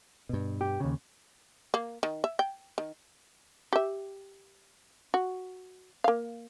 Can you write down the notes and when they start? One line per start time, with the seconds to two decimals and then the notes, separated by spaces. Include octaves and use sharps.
0.29 G2 B2
0.61 G4
0.80 D#2 C#3
1.74 A#3
2.03 D#3
2.24 E5
2.39 G5
2.78 D#3
3.73 G4 E5
5.14 F#4
6.04 A#3 F5